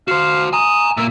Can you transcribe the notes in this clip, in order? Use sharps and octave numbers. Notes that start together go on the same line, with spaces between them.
F#4 C5 F5
G#5 A#5 D#6
A#2 A#3 E5